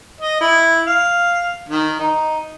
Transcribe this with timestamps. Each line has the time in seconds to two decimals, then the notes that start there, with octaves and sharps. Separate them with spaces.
0.21 D#5
0.41 E4
0.87 F5
1.69 D#3
2.00 D#4